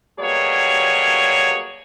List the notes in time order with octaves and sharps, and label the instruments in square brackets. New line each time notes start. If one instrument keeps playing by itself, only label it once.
[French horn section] B2 F#3 G3 A#3 G#4 C#5